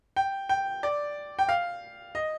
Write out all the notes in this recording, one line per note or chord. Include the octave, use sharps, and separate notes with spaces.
G5
G5
D5
G5
F5
D#5